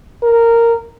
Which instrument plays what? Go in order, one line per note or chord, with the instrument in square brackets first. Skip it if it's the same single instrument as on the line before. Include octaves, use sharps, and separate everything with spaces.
[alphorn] A#4